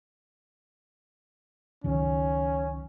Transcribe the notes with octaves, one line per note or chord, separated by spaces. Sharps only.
C#2 F#2 D#3 C#4